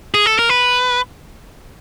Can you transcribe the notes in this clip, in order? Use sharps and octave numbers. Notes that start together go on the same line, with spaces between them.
G#4
A4
A#4
B4